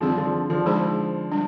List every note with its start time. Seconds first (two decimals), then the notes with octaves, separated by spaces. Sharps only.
0.01 D3 F3 G3 C4 D#4 G#4
0.17 D3 F3
0.50 D3 F3
0.66 G#3 D#4 G#4 C5
1.32 G3 D4